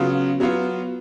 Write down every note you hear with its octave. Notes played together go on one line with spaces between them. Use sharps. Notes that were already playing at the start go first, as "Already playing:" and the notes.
Already playing: C#3 F#3 B3 F4
F#3 B3 F4